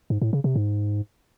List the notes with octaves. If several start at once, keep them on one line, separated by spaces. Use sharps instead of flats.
G#2
A2
C#3
C3
G#2